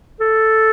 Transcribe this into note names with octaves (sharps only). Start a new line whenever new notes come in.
A4